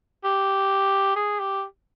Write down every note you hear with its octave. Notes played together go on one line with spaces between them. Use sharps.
G4
G#4
G4